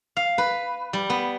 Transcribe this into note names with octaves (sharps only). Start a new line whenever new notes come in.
F5
B4
G3
B3